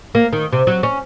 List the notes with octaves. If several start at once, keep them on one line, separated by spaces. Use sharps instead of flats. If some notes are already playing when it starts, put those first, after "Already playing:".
A#3
D#3
C3
F#3
C#4